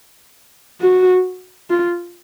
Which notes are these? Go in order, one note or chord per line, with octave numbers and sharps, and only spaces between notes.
F#4
F4